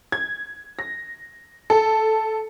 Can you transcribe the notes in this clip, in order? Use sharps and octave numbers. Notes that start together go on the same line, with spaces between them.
G#6
A#6
A4